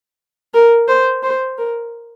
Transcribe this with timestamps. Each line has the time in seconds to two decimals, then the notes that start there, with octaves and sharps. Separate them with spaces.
0.54 A#4
0.88 C5
1.23 C5
1.58 A#4